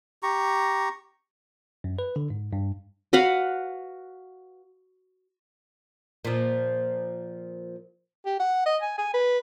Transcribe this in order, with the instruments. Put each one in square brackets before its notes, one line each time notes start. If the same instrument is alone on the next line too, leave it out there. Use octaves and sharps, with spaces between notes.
[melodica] G4 A#5 C#6
[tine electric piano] F#2
B4
D3
G#2
G2
[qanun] F#4 B4 F5 F#5
[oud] A#2 F3
[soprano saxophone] G4
F#5
D#5
G#5
G#5
B4